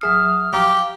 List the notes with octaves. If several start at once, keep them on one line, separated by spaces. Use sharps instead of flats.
A1 F#3 G#4 E5 D#6 F6 C7
A#1 F#3 G4 F5 A#5